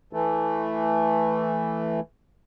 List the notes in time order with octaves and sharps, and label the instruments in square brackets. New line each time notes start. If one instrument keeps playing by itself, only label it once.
[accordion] E3 A3